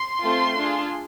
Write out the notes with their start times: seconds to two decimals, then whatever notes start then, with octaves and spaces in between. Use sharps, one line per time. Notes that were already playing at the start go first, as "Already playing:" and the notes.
Already playing: C6
0.22 A3 C4 F4 A4
0.56 D4 F4 G#4